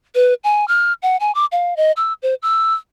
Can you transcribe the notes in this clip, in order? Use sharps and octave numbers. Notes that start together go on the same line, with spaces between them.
B4
G#5
F6
F#5
G#5
D6
F5
D#5
E6
C5
E6